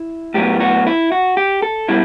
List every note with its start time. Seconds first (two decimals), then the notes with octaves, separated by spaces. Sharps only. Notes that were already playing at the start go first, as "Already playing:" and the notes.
Already playing: E4
0.34 A2 F#3 B3 G4
0.61 F#4
0.87 E4
1.12 F#4
1.37 G4
1.62 A4
1.89 B2 G3 E4